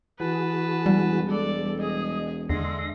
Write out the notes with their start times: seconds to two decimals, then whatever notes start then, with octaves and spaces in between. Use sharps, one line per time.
0.20 E3 F#4 G#4 B4 A5
0.86 E1 G3
1.29 G#3 A4 D5
1.79 G#4 D#5
2.49 E2 D3 G#3 E5 C6 A#6